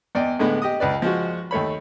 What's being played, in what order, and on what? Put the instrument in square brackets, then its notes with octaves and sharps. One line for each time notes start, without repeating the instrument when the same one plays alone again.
[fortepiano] E2 D5 D#5 G5
A2 D3 G#3 B3
G4 D#5 D#6
C#2 B4 D5
F3 G#3 F#4
D#2 A3 C#5 B5